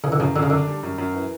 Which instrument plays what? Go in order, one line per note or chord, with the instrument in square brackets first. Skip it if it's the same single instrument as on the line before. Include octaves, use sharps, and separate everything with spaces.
[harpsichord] C#3 [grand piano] E3
[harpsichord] D3
[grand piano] F#2 [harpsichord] C#3
[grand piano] F#2 [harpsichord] D3
[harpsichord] C#3
[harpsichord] D3 [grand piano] D4
[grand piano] G3
F#2
F#2
E3